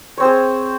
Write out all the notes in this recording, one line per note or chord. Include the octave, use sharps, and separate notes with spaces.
C4 G#4 C5 C#5